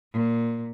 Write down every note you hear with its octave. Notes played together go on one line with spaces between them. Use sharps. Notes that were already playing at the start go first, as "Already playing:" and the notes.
A#2